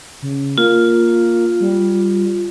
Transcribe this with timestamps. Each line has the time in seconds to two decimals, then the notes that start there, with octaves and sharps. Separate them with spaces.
0.22 C#3
0.58 A#3 F4
1.60 G3